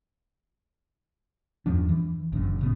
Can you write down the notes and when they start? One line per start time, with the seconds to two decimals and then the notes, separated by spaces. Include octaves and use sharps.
1.66 E2 G2 F3 D4
1.89 E3
2.32 F#1 F#2 A#2 D3
2.59 A2 C#3 B3